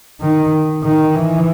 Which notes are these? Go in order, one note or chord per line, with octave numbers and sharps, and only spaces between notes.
D#3
D#3
E3